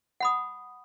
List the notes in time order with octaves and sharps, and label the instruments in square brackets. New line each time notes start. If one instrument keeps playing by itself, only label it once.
[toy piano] F#5 B5 D#6